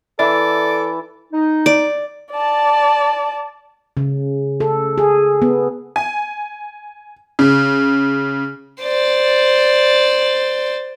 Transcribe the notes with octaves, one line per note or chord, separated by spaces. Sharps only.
E3 A4 D5
D#4
D5
D5 A5
C#3
A4
G#4
B3
G#5
C#3
C5 D5